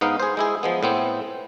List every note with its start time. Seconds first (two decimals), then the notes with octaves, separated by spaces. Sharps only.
0.01 G#2 B3 D#4 F5
0.20 G#4 C5
0.37 G#3 E4 G#4
0.63 F3 G#3 B3
0.83 A2 B3 C4